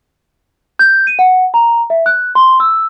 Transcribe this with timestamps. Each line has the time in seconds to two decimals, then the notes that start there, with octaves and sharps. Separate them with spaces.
0.79 G6
1.07 D#7
1.19 F#5
1.54 A#5
1.90 E5
2.06 F#6
2.35 C6
2.60 E6